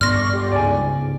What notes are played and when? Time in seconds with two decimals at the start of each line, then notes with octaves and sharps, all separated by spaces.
0.01 G2 B3 D5 C6 C#6 F6 A#6
0.33 G4 D5
0.52 C#2 G#2 D5 G#5